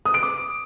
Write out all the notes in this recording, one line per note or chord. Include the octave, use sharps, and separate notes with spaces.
D#6
D7
D6